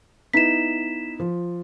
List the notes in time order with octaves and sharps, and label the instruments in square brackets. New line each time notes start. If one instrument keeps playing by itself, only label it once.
[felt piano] B3 D#4 E4 [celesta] B6 E7
[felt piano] F3